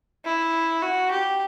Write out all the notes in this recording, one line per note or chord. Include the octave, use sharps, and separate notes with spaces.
E4
F#4
G4